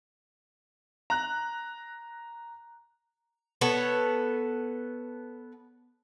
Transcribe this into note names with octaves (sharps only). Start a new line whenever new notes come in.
A#5 F#6
B3 A4 C#5